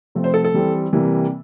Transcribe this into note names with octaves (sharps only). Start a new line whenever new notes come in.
C3 F3 A3 C4
C5
A4
A4
E3 G3 C4
C3 E3 G3 A#3